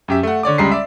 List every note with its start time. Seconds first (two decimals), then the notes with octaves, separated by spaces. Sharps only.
0.08 F#2 G4 E5
0.23 A3 F#5
0.43 D3 C#5 D5 D6
0.58 C#2 G3 G#3 A#5 C7
0.72 D5 E5